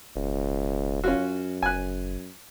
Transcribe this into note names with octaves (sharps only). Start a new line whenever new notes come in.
E1 C#2
F#2 C#4 F4 F#4
F#1 G#5 F#6